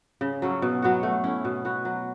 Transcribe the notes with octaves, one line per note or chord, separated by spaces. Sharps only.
C#3
F#3 C#4 A4
B2
F#3 B3 F#4
A3
C#4 E4
B2
B3 F#4 B4
F#3